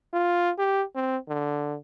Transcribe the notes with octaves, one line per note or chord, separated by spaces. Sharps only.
F4
G4
C4
D3